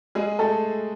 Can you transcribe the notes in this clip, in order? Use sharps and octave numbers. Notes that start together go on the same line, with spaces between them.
G#3 G#4
A3 A4